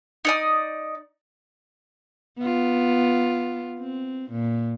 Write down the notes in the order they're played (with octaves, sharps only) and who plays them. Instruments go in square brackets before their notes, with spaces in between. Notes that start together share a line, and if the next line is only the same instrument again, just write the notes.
[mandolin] D#4 D5 D#6
[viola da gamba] B3 F4
C4
A#2